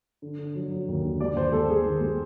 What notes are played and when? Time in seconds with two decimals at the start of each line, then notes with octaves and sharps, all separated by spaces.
0.22 D3
0.39 D3
0.55 F#3
0.71 F#3
0.88 D#2
1.04 D3
1.20 G3 D5
1.36 D#2 C5
1.52 G3 A4
1.69 G3 G#4
1.86 D#3
2.01 G3